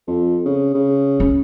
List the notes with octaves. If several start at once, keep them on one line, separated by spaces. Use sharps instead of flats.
F2
C#3
C#3
C#4